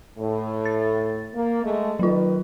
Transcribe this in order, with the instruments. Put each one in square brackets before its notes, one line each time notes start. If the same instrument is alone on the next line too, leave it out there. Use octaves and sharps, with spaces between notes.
[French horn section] A2
[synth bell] A6
[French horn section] A#3
G#3 A3
[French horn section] D#3 B4 [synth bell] F#3 F4